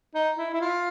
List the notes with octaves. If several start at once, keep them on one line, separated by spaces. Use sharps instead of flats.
D#4
E4
E4
F4